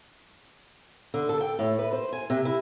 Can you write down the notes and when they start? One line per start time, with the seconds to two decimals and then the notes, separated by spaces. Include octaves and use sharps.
1.14 D3
1.29 A4
1.41 G5
1.59 A2
1.79 B4
1.93 C5
2.13 G#5
2.30 C3
2.45 E4